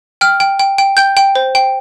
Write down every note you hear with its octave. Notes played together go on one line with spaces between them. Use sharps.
G5 F6
G5
G5
G5
G5 G6
G5
C5
G5